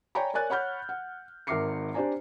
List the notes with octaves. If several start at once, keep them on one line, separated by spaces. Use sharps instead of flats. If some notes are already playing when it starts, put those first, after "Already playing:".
C#5 D5 G5 G#5 A#5 B5
A#4 C#5 D5 G#5 F#6 A6
C#5 F#5 B5 F6 G6
F#5
G#1 A#4 E5 D6 C7 C#7
D4 G4 C5 D5 G#5 A#5